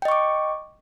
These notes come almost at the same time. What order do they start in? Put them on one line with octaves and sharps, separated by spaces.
G5 D#5 C#6 D6